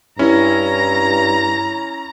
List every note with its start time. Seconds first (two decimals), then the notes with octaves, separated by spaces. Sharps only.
0.19 G2 C#4 E4 A#5